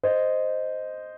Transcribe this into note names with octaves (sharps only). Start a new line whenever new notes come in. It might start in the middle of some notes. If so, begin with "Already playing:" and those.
C5 D#5